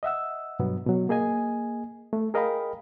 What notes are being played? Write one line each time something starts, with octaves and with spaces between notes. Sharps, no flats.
D#5 E5 F#5 E6
G2 B2 F#3 B3
B2 F#3
A#3 G#4 D#5 G#5
A3
G#4 A#4 D#5 F5 G5 B5